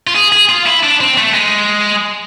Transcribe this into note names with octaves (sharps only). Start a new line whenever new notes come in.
F4
G#4
G#4
F4
E4
D4
C4
A3
G#3